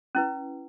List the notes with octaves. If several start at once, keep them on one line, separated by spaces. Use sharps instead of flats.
C#4 E4 B4